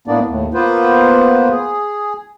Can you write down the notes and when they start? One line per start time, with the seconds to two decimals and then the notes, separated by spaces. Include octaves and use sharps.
0.08 A2 A#3 B3 D4 D5
0.26 D#2 A2
0.54 A#3 B3 F4 B4 C5
1.50 G#4